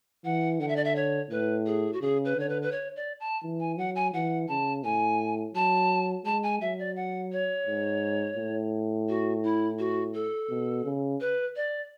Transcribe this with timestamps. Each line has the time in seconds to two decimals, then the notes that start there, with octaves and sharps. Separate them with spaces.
0.25 E3 F#5
0.60 D3 F#5
0.68 E5
0.76 D5
0.84 E5
0.96 C#5
1.30 A2 B4
1.66 G#4
1.93 F#4
2.01 C#3 G#4
2.25 B4
2.36 D3 C#5
2.49 B4
2.62 B4
2.72 C#5
2.96 D5
3.20 A5
3.43 E3
3.60 G#5
3.78 F#3 F#5
3.95 G#5
4.13 E3 F#5
4.48 C#3 A5
4.84 A2 G#5
5.54 F#3 A5
6.25 G#3 A5
6.43 G#5
6.61 F#3 E5
6.79 D5
6.96 F#5
7.32 C#5
7.67 G#2
8.37 A2
9.09 F#4
9.43 E4
9.79 F#4
10.14 A4
10.49 B2
10.85 C#3
11.20 B4
11.56 D5